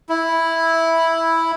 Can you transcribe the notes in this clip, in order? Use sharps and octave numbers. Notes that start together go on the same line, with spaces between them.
E4